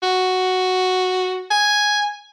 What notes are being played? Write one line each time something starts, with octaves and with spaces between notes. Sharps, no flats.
F#4
G#5